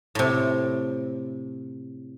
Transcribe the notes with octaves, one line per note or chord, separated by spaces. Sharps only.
A2 C3